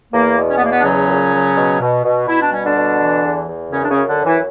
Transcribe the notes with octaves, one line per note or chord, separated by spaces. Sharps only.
E2 A#3
B2
C#4
B3
E2 A#3
B3
D4
C#3 F#3 C#4
A#2
F#3
B2
B2
B2
B2 E4
D4
G3 C#4
D3 D4
B2
E3
E2
E2
F#2 C#3 C#4
D4
C#3 C#4
F#2
D3 D4
F#2
E3 E4